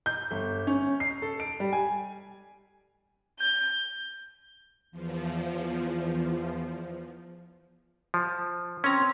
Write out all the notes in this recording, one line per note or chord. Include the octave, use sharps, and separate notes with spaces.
G6
G1
C#4
C7
A4
D7
G3
G#5
G6
E2 F3
F3
C4 C#4 A#5 C#6